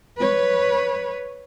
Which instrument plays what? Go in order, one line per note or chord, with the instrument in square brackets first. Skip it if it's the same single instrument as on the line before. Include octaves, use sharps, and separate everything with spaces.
[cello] B4 C#5